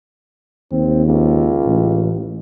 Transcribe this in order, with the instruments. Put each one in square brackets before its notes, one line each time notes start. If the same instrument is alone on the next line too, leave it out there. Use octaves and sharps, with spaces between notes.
[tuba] D#2 [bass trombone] C4
[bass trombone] C#2
[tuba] A1